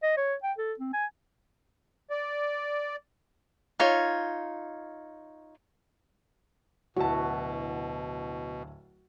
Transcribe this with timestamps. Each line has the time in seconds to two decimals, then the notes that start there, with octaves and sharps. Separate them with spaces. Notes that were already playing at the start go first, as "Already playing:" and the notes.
0.03 D#5
0.17 C#5
0.43 G5
0.58 A4
0.79 C4
0.93 G#5
2.10 D5
3.79 D#4 F4 C#5
6.97 D1 B2 E4 F#4 A5